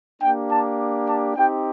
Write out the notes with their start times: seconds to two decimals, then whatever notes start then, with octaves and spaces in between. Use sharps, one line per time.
0.21 A#3 D4 G4 G5
0.50 A5
1.07 A5
1.36 C4 D#4 G4 G5